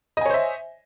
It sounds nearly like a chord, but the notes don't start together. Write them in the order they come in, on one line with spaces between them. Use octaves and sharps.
D#5 G#5 C#5 C5 E5